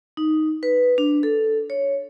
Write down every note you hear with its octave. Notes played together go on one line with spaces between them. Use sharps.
D#4
B4
D4
A4
C#5